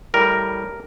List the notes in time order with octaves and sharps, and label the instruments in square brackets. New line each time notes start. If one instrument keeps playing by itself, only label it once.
[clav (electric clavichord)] A2 G3 A#4